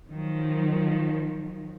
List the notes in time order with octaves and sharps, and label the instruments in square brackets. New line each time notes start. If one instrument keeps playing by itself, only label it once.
[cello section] D#3 F3 F#3